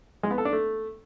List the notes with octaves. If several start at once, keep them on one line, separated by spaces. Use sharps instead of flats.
G#3
B3
A4
D4
A3